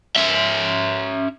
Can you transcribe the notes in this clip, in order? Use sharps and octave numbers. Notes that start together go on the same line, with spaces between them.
C#4 E5